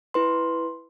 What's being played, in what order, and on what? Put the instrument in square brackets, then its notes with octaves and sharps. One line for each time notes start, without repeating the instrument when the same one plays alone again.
[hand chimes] E4 B4 C6